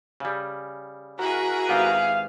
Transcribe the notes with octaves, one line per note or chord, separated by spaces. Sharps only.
C#3 G3
E4 F#4 G#4 A#4
G#1 B3 G4 F5